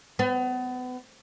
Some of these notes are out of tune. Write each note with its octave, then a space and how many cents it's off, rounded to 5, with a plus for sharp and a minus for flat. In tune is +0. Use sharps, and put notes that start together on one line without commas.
B3 +30